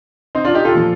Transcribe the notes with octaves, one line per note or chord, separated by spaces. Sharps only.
C4 D#4
D4 F4
D#4 G4
F4 A4
A#2 F3